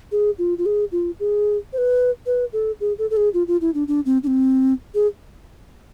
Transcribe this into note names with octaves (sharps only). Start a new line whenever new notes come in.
G#4
F4
F4
G#4
F4
G#4
C5
B4
B4
A4
G#4
A4
A4
G#4
F4
F4
E4
D4
D4
C4
D4
C4
G#4